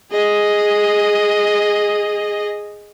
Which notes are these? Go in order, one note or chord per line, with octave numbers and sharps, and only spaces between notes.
G#4 D#5